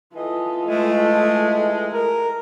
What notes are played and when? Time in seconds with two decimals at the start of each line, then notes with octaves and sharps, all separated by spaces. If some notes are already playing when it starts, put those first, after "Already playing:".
0.15 E3 F4 A4 D#5
0.66 E3 G#3 A3
1.93 A#4